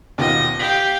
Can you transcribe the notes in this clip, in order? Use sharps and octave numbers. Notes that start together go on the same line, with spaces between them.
D#2 B2 F4 D#5
G4 F5 B6